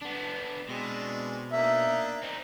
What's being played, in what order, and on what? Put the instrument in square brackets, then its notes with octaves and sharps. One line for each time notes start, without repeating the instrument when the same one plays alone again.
[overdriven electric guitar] B3 D4
[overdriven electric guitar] B2 [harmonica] G#3 C4 D4
[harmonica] A#3 D4 D#4 [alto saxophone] E5
[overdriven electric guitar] C4 D#4